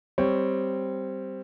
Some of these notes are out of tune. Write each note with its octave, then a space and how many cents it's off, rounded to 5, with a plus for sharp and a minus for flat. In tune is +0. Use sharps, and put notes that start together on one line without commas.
G3 +0 C4 +0 C#5 +5